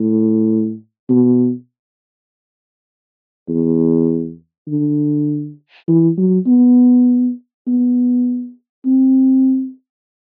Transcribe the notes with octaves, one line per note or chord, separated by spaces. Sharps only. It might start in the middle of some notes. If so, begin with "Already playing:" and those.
Already playing: A2
B2
E2
D3
E3
F#3
B3
B3
C4